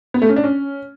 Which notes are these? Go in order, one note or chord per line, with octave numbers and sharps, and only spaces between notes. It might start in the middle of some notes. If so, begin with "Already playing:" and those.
B3
A3
C#4
D4
C#4